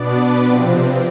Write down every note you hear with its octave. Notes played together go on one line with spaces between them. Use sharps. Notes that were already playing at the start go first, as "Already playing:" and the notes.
Already playing: B2 B3 D4 D5
B4
C3 F3 C4